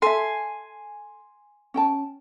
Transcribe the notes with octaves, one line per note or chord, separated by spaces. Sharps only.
A4 E5 G#5 C6
C#4 G5 A5